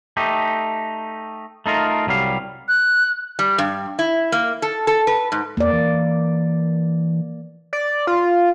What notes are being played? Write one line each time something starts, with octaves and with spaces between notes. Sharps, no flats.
A3 D#4 G4
A3 D#4 F4 A#4
C2 F#3 G3 F5
F#6
G3
G2
E4
A#3
A4
A4
B4
G#2
E2 A#3 D5
E3
D5
F4